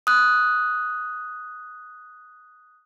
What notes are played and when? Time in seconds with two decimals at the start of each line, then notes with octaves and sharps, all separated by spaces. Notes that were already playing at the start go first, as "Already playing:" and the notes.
0.07 D#6 F#6